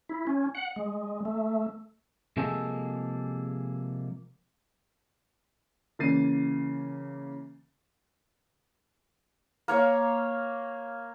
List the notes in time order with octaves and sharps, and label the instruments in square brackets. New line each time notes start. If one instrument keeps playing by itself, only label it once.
[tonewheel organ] E4
C#4
F#5
G#3
A3
[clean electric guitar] C3 F3 G#3 A#3 G#4 A4
[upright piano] C#3 E3 A#3 A6 C7 D#7
[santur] A#3 C#5 F5